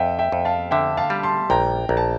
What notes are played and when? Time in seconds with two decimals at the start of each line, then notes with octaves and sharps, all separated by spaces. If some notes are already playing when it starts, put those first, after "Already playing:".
Already playing: F2 E5 G5
0.19 E5 G5
0.32 F2
0.45 F5 A5
0.71 D3 E5 G5
0.97 F5 A5
1.10 G3
1.23 A5 C6
1.50 A#1 G5 A#5
1.89 A#1 A#5
1.97 A5